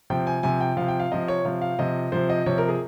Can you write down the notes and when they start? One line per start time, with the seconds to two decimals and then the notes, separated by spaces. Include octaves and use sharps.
0.10 C3 F3 G5
0.27 G#5
0.43 C3 F3 G#5
0.61 G5
0.77 C3 F3 F5
0.88 G5
1.00 F5
1.12 C3 F3 D#5
1.28 C#5
1.45 C3 F3 F5
1.62 F5
1.79 C3 F3 D#5
2.12 C3 F3 C5
2.30 D#5
2.46 C3 F3 C#5
2.58 A#4
2.69 G#4